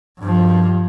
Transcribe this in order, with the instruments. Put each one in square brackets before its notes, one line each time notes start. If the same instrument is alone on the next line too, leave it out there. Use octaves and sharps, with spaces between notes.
[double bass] G2 F3